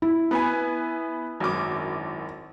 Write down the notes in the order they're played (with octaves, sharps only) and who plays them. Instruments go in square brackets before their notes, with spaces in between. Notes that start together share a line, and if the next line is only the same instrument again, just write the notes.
[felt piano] E4
[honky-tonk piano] B3 B4 G#5
G#1 F#2 D6